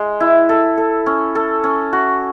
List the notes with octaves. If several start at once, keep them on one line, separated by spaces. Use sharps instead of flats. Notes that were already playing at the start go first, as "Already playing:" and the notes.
Already playing: G#3
E4
A4
A4
C#4
A4
C#4
F#4